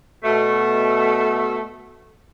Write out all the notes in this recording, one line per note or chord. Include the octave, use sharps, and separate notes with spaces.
B2 A3